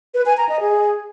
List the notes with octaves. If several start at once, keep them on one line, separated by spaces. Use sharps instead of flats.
B4
G#5
A#5
D#5
G#4